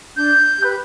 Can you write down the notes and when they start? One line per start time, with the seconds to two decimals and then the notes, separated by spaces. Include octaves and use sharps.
0.16 D4 G6
0.58 G4
0.63 B4